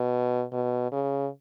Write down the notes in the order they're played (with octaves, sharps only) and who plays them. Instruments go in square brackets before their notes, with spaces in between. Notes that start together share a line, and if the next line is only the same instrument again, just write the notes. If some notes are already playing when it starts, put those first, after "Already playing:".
Already playing: [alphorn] B2
B2
C#3